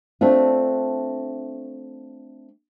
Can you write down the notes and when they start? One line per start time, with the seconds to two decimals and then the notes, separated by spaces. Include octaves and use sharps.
0.21 A3 C4 D4 F4